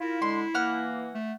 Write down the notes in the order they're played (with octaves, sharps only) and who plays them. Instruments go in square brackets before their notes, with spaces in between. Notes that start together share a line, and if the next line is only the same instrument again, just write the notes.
[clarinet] E4 [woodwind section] F4 A#4
[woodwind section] D3 G#3 [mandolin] C6
[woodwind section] E3 A#3 [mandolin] F#5 F6
[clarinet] A3